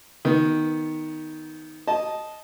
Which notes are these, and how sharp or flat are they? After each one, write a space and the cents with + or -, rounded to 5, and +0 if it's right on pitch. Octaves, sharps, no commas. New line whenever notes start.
D#3 +5 B3 +0
D#5 +0 A5 -15